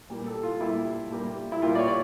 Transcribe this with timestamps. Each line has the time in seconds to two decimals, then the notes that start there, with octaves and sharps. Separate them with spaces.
0.10 A#2 G3 A#3
0.26 A4
0.43 F4
0.61 A#2 G3 A#3 E4
1.11 A#2 G3 A#3
1.52 E4
1.62 A#2 G3 A#3 F4
1.75 D5
1.79 C#5
1.88 D5